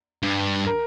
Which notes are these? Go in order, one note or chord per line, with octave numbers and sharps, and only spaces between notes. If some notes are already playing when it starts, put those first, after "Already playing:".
G2
A#4